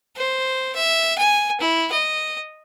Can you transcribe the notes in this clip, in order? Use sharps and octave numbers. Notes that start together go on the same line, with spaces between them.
C5
E5
G#5
E4
D#5